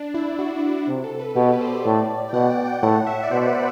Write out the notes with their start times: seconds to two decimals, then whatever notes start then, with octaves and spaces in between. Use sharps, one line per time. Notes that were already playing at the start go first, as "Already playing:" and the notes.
Already playing: D4
0.14 E4
0.39 F#4
0.55 E4
0.72 F#4
0.87 C3
1.04 A4
1.19 B4
1.36 B2 G4
1.52 B4
1.61 C5
1.68 D5
1.85 A2
2.29 G5
2.33 B2 F#5
2.50 G5
2.65 G5
2.82 A2 F#5
3.07 E5
3.23 D5
3.31 B2 C5
3.47 B4